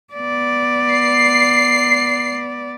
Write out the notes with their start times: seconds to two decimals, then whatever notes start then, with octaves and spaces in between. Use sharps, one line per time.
0.13 B3 D5
0.91 C7